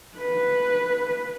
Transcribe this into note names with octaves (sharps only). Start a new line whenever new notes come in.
B4